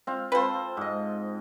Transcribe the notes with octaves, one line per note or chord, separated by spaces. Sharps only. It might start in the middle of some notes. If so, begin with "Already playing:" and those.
C4 F4 F5
C4 F4 A4 B4 C5
G#2 D#5